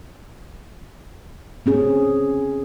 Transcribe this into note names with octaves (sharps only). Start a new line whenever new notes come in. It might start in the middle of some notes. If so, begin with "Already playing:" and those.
C4 C#4 G#4